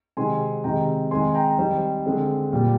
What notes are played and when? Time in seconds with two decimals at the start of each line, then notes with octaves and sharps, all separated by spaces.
0.17 C3 D#3 G#3 C4 G#5 C6
0.64 C3 D#3 G#3 G5 A#5
1.11 D#3 G#3 C4 G#5 C6
1.35 G5 A#5
1.58 D#3 G3 C4 C5
2.06 D3 G#3 C4
2.53 A#2 G3 A#3